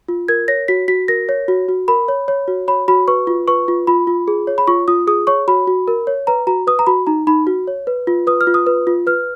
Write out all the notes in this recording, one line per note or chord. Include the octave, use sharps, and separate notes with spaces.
F4
A#4 G#6
C#5 A#6
F#4 B6
F#4 B6
A#4 A#6
C#5
F#4
F#4
A#4 B5
C#5
C#5
F#4
C#5 B5
F#4 B5
B4 C#6
F4
B4 C#6
F4
F4 B5
F4
G#4
C#5
B5
F4 C#6
F4 D#6
G#4 D#6
C#5 C#6
F#4 B5
F#4
A#4
C#5
B4 A#5
F#4 A#5
B4 D#6
A#5
F#4 B5
D#4 A#5
D#4 B5
F#4
C#5
B4
F4
B4 D#6
F6
F4
D#6
B4
F4
B4 F6